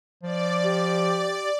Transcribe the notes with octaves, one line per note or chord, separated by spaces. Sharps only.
F3 D5
G4